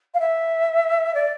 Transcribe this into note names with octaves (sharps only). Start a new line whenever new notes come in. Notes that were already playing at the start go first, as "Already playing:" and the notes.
F5
E5
D5